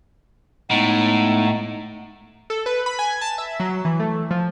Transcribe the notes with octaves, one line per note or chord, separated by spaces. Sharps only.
A2 G#3 B3 D#4
A4
B4
B5
G#5
A5
E5
F#3
E3
A3
F3